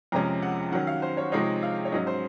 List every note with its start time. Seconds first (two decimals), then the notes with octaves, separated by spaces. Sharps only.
0.12 F2 C3 F3 G#3 C#4 A#5
0.42 F#5
0.72 D#3 F#3 C#4 F#5
0.87 F5
1.02 C5
1.17 C#5
1.32 C3 F3 G#3 C4 D#4 C#5
1.63 F5
1.85 C#5
1.92 G#2 F#3 C#4 D#5
2.07 C5